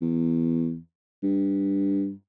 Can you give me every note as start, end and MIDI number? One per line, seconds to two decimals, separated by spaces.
0.02 0.78 40
1.23 2.13 43